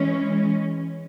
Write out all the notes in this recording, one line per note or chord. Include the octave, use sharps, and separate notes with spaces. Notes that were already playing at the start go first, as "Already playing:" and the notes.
Already playing: E3 G#3 C#4